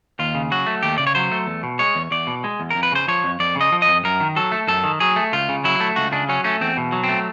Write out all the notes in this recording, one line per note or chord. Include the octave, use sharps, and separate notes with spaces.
D#2 F4
C#3
F#3 F#4
A3
D#2 G4
C#3 D5
C#5
F#3 C5
A3
E2
B2
G#3 C#5
E2
E2 D5
B2
G#3
E2
F2 A#4
B4
C#3 C5
F3 C#5
F2
F2 D5
C#3
D#5
F3
D#5
F2
F#2 A#4
D#3
F#3 A4
A3
F#2 A4
D#3
F#3 G#4
A3
C#2 F4
C#3
F#3 E4
A3
C#2 F#4
C#3 D4
F#3 C#4
A3 C#4
E2 C4
B2
F#3
C4
A3